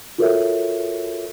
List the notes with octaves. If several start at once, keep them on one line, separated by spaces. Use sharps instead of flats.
F4 F#4 A4 A#4 C#5 E5